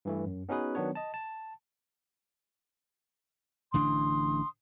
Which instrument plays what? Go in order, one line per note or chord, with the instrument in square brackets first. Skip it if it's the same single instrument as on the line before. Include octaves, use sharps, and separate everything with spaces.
[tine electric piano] G2 E3 A3
F#2
B3 C#4 D#4 F#4 G#4 B4
D#3 F#3 B3 D4 C#5
D#5 A5
A5
[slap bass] A1 D3 D4 [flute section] C6 D#6